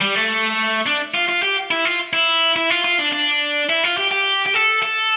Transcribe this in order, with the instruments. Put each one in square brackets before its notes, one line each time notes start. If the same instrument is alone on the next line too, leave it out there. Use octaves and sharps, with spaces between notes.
[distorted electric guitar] G3
A3
D4
F4
F4
G4
E4
F4
E4
E4
F4
F4
D4
D4
E4
F4
G4
G4
G4
A4
A4